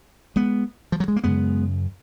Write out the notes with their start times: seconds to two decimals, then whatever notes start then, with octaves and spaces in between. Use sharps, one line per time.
0.36 G#3 B3
0.92 F3
1.00 F#3
1.08 G#3
1.16 A#3
1.24 F#2 C#3 G#3 B3